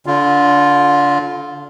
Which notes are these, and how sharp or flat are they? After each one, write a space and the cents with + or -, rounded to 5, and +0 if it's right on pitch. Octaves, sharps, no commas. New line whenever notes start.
D3 -30 F4 +0